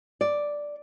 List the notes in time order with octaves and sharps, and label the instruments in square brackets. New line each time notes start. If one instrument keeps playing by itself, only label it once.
[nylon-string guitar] D5